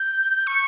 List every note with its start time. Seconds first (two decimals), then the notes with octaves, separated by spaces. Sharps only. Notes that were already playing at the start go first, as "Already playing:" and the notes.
Already playing: G6
0.47 C#6